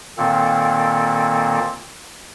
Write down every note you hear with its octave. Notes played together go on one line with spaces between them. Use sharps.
A#2 D#3 A#3 C4 A4